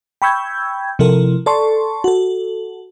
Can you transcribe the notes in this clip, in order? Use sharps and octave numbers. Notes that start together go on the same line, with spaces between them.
G5 B5 C#6 E6 G6 G#6
C3 F3 E4 A4 A#4
A4 D5 A5 C6 C#6
F#4 A4